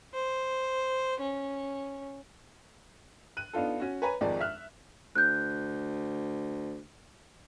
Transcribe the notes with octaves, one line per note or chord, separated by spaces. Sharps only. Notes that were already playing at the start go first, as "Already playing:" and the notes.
C5
C#4
F#6 D#7
B3 D4 D#4 F4 A4
C#4 F#4
B4 C#5 G#5 A#5 B5
G#1 F2 G#2 G#3 D5 A5
E5 F6 F#6
D2 F#6 G6